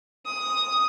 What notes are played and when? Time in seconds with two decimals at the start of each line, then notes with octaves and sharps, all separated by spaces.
0.26 D#6